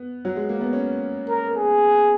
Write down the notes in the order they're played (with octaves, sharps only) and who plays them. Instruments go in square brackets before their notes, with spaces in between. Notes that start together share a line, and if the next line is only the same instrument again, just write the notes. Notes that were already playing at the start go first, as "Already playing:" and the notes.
Already playing: [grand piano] B3
F#3
G#3
A#3
B3
C#4
[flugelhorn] A#4
G#4